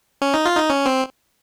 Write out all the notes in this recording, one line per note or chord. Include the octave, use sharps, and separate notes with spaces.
C#4
D#4
F4
D#4
C#4
C4